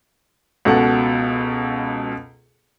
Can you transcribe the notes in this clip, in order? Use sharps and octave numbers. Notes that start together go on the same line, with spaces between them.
C#2 B2 A4 F#5